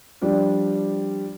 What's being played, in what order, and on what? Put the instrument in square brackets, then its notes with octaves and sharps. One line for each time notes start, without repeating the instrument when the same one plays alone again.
[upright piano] F3 G3 D4